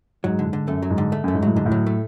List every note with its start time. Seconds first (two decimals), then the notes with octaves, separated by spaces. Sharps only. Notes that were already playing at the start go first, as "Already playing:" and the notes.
0.24 G#2 F#3
0.39 D3
0.46 G#2
0.53 D3
0.68 F#2 A3
0.82 F#3
0.90 G#2
0.98 D3
1.12 A3
1.24 F#2 A3
1.34 G#2
1.42 A2 F#3
1.55 G#2 D3
1.66 A2
1.72 F#3
1.86 A3